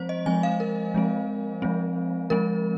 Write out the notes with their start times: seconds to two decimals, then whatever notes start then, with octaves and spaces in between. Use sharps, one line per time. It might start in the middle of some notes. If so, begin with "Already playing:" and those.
Already playing: F3 G#3 C4 C5
0.09 D#5
0.26 F3 G#3 C4 G#5
0.43 F5
0.60 A#4
0.94 F3 G#3 C4
1.62 F3 G#3 C4
2.30 F3 G#3 C4 A#4